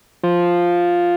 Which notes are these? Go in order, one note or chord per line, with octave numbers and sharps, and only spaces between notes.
F3